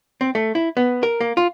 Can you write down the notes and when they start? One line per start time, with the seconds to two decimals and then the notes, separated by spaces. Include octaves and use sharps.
0.21 C4
0.35 A3
0.55 E4
0.77 B3
1.03 A#4
1.21 A#3
1.37 F4